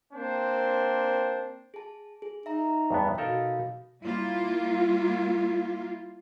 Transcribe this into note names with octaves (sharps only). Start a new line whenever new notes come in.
A#3 C4 D4 C5
G#4 A5
G#4
D#4 E5 A#5
E2 G2 B3
B2 D#4 A4 A#4 F5
G3 A#3 E4 F4